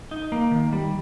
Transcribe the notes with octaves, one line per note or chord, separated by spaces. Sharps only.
D#4
A#3
D#3
G3